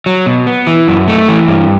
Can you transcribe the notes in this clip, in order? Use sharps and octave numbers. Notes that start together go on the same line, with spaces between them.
F#3
B2
B3
E3
F#2
A3
E3
G2